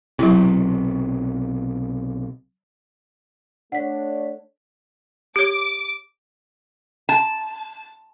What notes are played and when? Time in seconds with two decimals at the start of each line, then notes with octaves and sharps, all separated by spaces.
0.19 B1 C3 F#3 E4
3.72 A3 D4 C#5 F#5 B6
5.36 G4 C#5 D6
7.09 A5